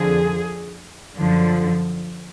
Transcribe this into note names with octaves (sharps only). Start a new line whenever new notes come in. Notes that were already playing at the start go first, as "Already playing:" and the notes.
Already playing: F2 D3 F3 G#4
F#2 D3 F3